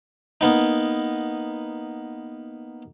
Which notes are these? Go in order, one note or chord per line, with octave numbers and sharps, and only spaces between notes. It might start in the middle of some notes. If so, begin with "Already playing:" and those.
A#3 B3 D#4